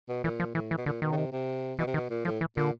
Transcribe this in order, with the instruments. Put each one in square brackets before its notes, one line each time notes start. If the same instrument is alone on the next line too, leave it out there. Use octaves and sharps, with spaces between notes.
[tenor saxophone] B2
[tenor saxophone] A#2 [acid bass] E3
[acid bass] F3
[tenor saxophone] A2 [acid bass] E3
[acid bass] E3
[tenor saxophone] B2
[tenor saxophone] A#2 [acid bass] D3
[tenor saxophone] B2 [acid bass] D#3
[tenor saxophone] C#3
C3
C3
[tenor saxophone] B2 [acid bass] E3
[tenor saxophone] C3
[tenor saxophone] B2 [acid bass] D#3
[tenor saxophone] A#2
[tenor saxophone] A2 [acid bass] F3
[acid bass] E3
[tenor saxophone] A#2 [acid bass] D3